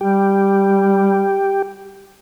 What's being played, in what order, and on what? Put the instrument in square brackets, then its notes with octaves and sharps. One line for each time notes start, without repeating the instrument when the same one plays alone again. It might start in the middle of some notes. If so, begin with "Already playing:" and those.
[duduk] G3 [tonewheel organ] G4